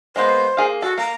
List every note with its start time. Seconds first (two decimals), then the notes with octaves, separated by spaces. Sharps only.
0.16 G#3 A#3 B3 C5
0.57 A#3 G#4 F5
0.82 F#4 A4
0.98 A#3 A#5